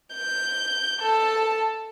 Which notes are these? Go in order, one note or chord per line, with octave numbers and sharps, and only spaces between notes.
G6
A4 A5